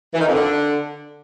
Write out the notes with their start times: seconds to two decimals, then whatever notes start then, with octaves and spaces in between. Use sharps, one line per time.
0.14 E3
0.21 D#3
0.27 F2
0.34 D3